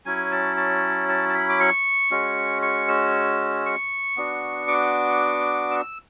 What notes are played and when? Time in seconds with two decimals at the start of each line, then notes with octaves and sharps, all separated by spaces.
0.06 F#3 C#4 E4 G#5
0.31 A5
0.57 A5
1.09 A5
1.29 A5
1.34 B5
1.49 D6
1.60 C#6
2.11 G#3 C#4 F#4
2.62 C#6
2.88 E6
3.66 C#6
4.17 B3 D4 F#4
4.68 D6
5.71 E6